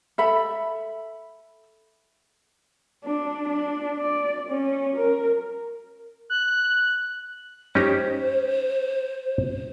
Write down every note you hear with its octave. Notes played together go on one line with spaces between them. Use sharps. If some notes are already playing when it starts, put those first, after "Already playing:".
A4 E5 B5
D4
D4
D5
C#4
A#4
F#6
C#4 D#4 G4 C5